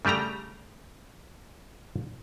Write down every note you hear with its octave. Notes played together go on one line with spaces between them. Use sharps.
C#3 G3 A3 G4 A#5